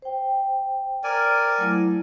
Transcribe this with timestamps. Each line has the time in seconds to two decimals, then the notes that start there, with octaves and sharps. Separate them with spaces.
0.02 C5 G5
1.04 A#4 D5 G#5
1.58 F#3 A3 E4